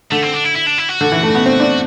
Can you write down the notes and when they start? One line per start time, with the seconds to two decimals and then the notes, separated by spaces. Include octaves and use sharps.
0.11 D3 A3
0.22 C4
0.34 D4
0.44 E4
0.56 E4
0.67 D4
0.78 E4
0.89 F#4
1.01 D3
1.12 E3
1.23 A3
1.35 B3
1.46 C4
1.60 D4